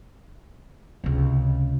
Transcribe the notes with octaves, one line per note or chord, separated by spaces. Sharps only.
C#2 C3